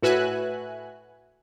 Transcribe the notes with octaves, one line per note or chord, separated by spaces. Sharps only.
A2 F#4 B4 E5 G#5 F#6